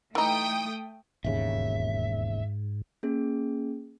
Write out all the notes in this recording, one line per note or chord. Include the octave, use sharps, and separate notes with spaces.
E3 A3 D#4 G5 D#6
E1 D#2 G#2 C#3 E5
A#3 C#4 G#4